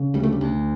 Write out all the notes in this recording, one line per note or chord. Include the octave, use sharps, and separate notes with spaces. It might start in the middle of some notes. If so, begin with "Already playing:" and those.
Already playing: C#3
D2 G3
A3
G3
D2